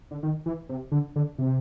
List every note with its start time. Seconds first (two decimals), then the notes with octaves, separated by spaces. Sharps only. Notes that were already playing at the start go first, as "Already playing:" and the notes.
0.11 D3
0.23 D#3
0.46 E3
0.69 C3
0.92 D3
1.16 D3
1.39 C3